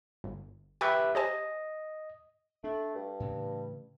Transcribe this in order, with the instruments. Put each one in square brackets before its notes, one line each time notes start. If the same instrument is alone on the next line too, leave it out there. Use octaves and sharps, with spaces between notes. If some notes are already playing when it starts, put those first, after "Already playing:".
[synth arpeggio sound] G1
[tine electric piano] G4 B4 E5 [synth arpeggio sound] G5 C#6 G#6
[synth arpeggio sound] G4 C5 G#5 [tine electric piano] D#5
[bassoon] A3 [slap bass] D4
[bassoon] G2
[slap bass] A2 C#3 E3